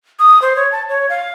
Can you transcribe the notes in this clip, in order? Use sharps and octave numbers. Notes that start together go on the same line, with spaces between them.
D#6
C5
C#5
A5
C#5
F5